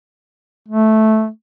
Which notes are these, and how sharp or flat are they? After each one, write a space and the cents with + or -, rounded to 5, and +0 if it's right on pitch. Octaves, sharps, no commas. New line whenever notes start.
A3 -10